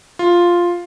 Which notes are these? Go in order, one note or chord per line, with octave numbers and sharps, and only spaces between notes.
F4